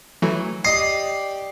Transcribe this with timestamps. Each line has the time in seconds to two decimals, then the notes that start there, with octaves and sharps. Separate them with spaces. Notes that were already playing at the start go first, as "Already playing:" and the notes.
0.22 E3 F#3 A3
0.65 G4 D5 D#5 D#6 C7